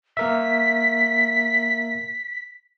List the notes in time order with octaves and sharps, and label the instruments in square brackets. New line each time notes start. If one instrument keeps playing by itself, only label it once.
[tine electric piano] A#3 A#4 E5 [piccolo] B6